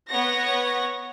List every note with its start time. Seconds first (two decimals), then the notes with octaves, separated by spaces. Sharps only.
0.10 B3 C#5 F#5 A#6